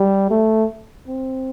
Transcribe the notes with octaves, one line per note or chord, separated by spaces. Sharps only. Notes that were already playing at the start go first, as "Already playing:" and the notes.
Already playing: G3
A3
C4